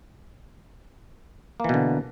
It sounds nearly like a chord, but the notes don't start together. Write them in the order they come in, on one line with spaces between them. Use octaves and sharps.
A#3 E3 B2 D3